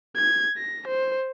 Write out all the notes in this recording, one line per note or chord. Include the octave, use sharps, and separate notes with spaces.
G#6
A#6
C5